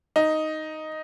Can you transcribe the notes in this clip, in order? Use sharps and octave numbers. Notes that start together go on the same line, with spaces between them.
D#4